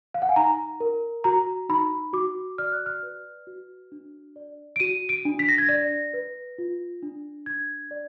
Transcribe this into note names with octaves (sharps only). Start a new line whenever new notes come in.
F5
F#5
G#5
D#4 A#5
A#4
F#4 A#5
D#4 B5
F#4 D6
D5 F6
F#6
F6
B4
F#4
D4
D5
D7
F#4 D#7
D7
D4
B6
A#6
G#6
D5 A#6
B4
F4
D4
D4 G#6
D5